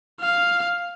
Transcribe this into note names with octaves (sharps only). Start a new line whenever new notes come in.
F5